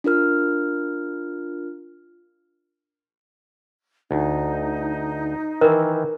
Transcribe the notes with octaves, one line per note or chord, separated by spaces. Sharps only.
D4 F4 A#4 F6
D2 D#4
D#3 E3 A#4